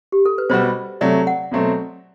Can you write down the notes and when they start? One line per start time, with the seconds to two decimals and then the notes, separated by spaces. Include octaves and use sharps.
0.12 G4
0.26 A4
0.38 B4
0.50 B2 G3 B3 F#4 C5
1.01 C3 F#3 A3 D5
1.27 F#5
1.52 B2 F#3 A3 C4